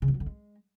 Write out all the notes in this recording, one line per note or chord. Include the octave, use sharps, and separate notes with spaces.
C#3
F3
F#3
D3
G#3